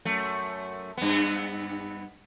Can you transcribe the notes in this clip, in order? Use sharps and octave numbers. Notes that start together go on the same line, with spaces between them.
F#2 A3
G2 B3